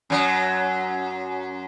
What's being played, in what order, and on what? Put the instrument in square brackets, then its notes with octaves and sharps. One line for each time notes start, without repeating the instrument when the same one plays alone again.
[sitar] F#2 F#3